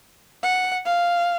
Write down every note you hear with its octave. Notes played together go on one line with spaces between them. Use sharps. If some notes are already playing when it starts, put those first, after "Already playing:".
F#5
F5